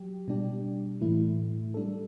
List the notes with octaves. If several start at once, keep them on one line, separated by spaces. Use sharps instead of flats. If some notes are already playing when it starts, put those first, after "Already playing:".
Already playing: F#3 G4
B2 G3 D4 G4
A2 E3 A3 E4
G3 D4 A4